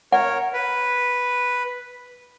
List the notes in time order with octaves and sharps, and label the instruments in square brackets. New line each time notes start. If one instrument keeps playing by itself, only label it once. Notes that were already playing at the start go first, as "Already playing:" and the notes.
[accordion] A#4 C#5 [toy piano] F#5
[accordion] B4